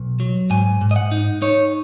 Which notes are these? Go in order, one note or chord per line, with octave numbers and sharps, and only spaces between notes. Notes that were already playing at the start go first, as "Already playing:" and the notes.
Already playing: B1
F#3
G#2 G#5
G#2
D#5
F#5
D#4
D#4 C#5